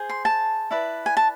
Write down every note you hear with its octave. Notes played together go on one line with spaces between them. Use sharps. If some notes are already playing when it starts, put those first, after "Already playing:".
Already playing: G#4 C5
C6
A5
E4 B4 D5
G#5
A5